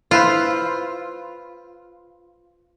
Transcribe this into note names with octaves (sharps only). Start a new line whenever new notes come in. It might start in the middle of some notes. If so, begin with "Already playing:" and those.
E4 F4 B4 C5